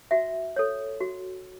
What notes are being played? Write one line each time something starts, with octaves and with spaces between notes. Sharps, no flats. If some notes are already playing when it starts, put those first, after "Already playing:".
F#4 E5
A4 C#5
F#4